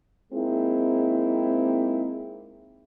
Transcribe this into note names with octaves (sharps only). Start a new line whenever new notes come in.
G#3 A#3 C4 D#4 E4